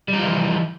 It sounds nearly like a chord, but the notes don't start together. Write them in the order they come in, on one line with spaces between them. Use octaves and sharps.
G3 D#4 F3 E3